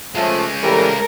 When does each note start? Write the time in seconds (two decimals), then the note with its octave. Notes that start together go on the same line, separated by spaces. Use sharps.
0.15 F3 G#3 A3 C#4
0.63 A2 E3 G3 A4 A#4